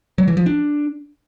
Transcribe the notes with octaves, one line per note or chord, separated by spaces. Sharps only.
F#3
E3
F3
D4